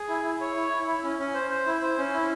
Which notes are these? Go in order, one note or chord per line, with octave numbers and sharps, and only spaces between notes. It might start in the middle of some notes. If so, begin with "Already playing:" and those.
Already playing: G#4
E4
E4
C#5
E4
E4
E4
C#4
C#4
C5
C5
E4
C5
C#4
E4